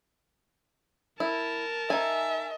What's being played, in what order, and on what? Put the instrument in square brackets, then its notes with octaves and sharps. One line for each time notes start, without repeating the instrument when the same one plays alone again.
[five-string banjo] E4 [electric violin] A#4 A5
[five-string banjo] D#4 G#5 [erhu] E5